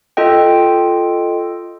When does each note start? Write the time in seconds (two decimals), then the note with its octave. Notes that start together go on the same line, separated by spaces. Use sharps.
0.17 F4 A4 D#5 G5